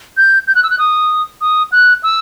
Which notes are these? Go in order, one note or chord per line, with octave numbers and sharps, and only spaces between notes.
G6
G6
F#6
E6
F#6
D#6
D#6
F#6
E6